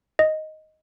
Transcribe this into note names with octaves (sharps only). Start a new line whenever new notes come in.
D#5